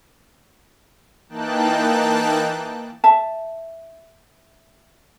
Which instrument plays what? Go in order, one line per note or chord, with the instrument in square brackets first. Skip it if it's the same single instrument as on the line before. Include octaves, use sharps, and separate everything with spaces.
[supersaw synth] E3 A#3 D#4 G5 A5 F#6
[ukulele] E5 A5